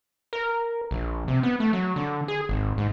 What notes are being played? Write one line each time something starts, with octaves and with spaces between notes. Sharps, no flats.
A#4
A#1
C3
B3
A3
F#3
D3
G#4
G#1
G#2